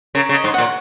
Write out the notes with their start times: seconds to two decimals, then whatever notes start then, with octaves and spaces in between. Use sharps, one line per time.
0.15 C#3 A#4
0.29 C#3
0.34 D#5
0.44 G#2
0.54 A#2 F#5